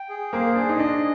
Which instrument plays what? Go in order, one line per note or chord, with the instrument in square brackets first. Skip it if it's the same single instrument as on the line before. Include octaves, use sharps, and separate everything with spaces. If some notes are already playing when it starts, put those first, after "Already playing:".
Already playing: [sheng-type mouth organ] G5
G#4
[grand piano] A#3 [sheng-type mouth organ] C5
[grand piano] D4 [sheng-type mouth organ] G#4
[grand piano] D#4
[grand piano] D4 [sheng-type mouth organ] D#5